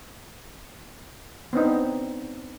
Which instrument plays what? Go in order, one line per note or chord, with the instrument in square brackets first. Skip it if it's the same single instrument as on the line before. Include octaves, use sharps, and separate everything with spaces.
[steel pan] B3 C4 D4 D#4